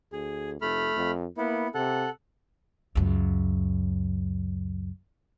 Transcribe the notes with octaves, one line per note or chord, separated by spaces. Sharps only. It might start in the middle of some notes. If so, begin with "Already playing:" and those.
D2 G#4
F1 A3 B5 F6
F2
A#3 B3 E4
C3 A4 F#5
C#2 F#2